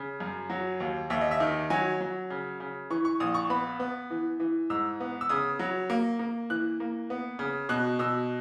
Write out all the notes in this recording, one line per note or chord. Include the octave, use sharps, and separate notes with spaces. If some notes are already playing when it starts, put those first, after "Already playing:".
Already playing: C#3
F#2
F#3
D#2
D#2 E5
D#5
E5
D#3
F#3 G#5
F#3
C#3
C#3
E3 C#6
C#6
A#1 D#6
C#6
B3 B5
B3
E3
E3
G#2 E6
B3
E6
C#3 D#6
F#3
A#3
A#3
E3 F#6
A#3
B3
C#3
B2 F#6
B2 E6